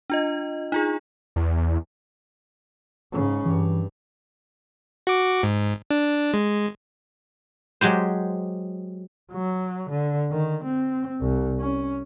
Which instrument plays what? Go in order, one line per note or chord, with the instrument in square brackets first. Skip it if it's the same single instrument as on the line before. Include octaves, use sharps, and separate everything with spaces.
[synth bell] D4 F4 D#5
D#4 F4 G#4
[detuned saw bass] E2
[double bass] G#2 C#3
[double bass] G2 [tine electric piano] E3
[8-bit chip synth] F#4 D6
G#2
D4
G#3
[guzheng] F#3 G#3 G4 C5
[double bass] F#3
D3
D#3
C4
C2
C#4